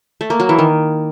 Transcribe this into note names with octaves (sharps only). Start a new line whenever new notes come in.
A3
A#3
F#3
E3
D#3